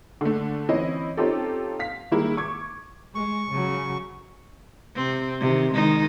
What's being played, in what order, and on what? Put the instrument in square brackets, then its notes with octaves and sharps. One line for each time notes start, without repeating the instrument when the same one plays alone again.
[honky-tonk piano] D3 A3
E3 C4 C#4 E4 D#5
C4 C#4 D#4 F4 G4 A4
F5 B6
D#3 G3 G#3 A#3 E4
C#6 D6 G#6
[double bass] G#3 [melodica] C#6
[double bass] C#3 F#3
[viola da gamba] C3 C4
C3 D#3
D#3 G#3 D#4